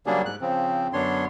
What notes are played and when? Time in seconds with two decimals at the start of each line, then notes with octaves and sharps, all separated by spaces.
0.06 C#3 F#3 G3 A#3 D4 G#4
0.25 G#2 F#6
0.41 C#3 F3 C4
0.93 F#2 D3 B3 D4 C#5 C6